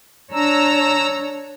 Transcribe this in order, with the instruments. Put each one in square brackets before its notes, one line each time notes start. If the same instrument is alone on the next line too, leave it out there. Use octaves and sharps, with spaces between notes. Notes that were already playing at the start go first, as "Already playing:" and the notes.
[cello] D4 C#5 [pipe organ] A#5 E6